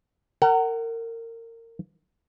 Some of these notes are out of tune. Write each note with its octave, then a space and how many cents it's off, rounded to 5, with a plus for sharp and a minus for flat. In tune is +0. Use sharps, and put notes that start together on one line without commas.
A#4 -30 F#5 +30 A#5 +0